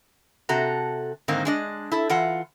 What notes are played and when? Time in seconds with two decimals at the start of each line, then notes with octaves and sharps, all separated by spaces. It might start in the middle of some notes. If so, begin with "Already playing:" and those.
0.49 C3 F#4 A4 A#5
1.28 G#2 D3 D#3 A#3 C4
1.45 G#3 D4 D#5
1.92 E4 A4
2.10 E3 F4 F#5